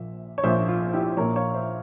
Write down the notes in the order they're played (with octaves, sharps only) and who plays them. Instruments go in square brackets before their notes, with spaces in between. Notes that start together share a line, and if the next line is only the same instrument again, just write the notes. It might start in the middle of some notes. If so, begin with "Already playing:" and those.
Already playing: [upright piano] A#1 A#2 F3 E5
C#5
A#1 A#2 F3 C5 E5
F4
E4 G4
A#1 A#2 F3 A#4 C#5
C#5 F5
C5 E5